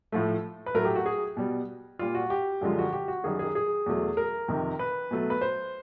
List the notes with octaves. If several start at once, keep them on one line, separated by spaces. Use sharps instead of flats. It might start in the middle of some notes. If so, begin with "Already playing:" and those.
A2 F3 A3
B4
A2 F#3 A3 A#4
G4
F#4
G#4
B2 G3
A#2 G3 F4
F#4
G4
F#2 D3 F3 G#3 F4
F#4
G4
F#4
F#2 D#3 G3 G#4
G#4
G#4
E2 B2 F#3 A3
A#4
F2 C3 D#3
B4
B2 F#3 A3
B4
C5